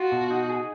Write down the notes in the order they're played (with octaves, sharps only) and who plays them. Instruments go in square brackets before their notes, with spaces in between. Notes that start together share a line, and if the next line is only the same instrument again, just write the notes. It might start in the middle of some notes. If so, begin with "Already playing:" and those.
Already playing: [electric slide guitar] F4 [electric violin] F#4
[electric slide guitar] B2
D#4
G#4